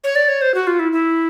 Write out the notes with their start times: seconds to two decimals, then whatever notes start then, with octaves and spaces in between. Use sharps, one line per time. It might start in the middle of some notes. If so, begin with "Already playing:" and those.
0.04 C#5
0.16 D5
0.29 C#5
0.41 C5
0.54 F#4
0.67 F4
0.79 E4
0.92 E4